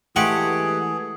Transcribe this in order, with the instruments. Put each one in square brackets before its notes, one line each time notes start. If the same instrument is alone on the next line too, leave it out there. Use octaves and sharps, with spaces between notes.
[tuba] E3 [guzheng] G#3 A3 [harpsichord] G4 F#5 [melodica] G#4